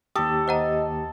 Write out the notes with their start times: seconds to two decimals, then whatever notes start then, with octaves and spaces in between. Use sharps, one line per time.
0.16 D#2 G4 A4 D#6
0.48 C5 D#5 F#5 A#5